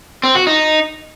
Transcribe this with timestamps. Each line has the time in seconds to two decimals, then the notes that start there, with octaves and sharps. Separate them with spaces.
0.23 C4
0.35 F#4
0.47 D#4